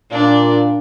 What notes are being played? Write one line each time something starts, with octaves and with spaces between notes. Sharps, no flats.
A#2 D4